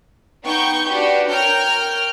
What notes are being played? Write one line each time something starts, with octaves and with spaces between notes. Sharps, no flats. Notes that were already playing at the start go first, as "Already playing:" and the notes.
B3 D#4 G5 C#6 G6
D4 F#4 G4 B4
A#4 C#5 G5 F6 G6